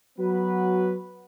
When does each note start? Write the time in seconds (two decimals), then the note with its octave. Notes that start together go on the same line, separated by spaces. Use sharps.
0.19 F#3 B3 F#4 B4